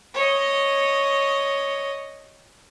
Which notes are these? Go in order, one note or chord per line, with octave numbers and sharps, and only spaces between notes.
C#5 D#5